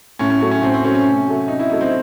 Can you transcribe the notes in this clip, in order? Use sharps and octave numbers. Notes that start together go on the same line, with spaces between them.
A2 C#4
C#4
F#3 A3 C#4
C#4
A2 C4
C4
F#3 A3 C#4
C#4
C3
F#3 A3
C3 D#4
E4
F#3 A3 D#4
C4